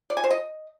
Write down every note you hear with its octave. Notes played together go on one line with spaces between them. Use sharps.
D5
G#5
C5
D#5